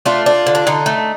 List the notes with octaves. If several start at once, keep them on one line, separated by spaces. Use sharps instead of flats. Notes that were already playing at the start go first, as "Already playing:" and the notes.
A3 D4 F4
D4
D3
D4
D3 D#4
A3